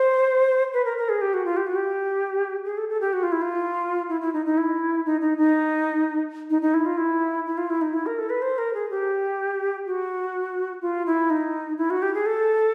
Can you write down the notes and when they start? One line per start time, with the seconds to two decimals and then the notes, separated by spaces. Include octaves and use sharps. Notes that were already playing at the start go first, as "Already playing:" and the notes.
Already playing: C5
0.73 B4
0.85 A#4
0.98 A#4
1.09 G#4
1.22 G4
1.34 F#4
1.45 F4
1.57 G4
1.67 F#4
1.76 G4
2.65 G#4
2.78 A4
2.89 A4
3.01 G4
3.13 F#4
3.23 F4
3.32 E4
3.42 F4
4.09 E4
4.21 E4
4.33 D#4
4.46 D#4
4.57 E4
5.06 D#4
5.21 D#4
5.38 D#4
6.50 D#4
6.62 D#4
6.74 E4
6.86 F4
6.97 E4
7.46 E4
7.58 F4
7.70 E4
7.81 D#4
7.94 E4
8.06 A#4
8.18 A4
8.30 B4
8.42 C5
8.58 A#4
8.74 G#4
8.90 G4
9.86 F#4
10.82 F4
11.06 E4
11.30 D#4
11.78 E4
11.90 F#4
12.02 G4
12.14 G#4
12.26 A4